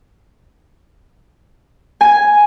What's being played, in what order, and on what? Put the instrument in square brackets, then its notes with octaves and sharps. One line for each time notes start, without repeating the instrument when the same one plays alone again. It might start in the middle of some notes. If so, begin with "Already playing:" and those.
[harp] G#5